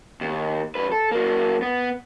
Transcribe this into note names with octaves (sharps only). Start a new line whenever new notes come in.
D#2
F#2 B4
A4
F#3 A#3
B3